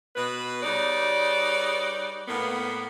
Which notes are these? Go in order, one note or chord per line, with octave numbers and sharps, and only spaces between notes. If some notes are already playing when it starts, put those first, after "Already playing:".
B2 B4
G3 D#4 G#4 B4 C#5 D5
A2 A#3 B3